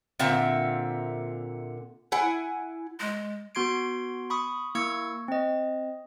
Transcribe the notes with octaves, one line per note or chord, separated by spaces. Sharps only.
A#2 D3 C4 E5
E4 F#5 G#5
G#3
B3 F#4 C6 G#6 C7 D7
B5 C#6 D#6
A#3 E4 C#6 E6 G#6 C#7
C4 D#5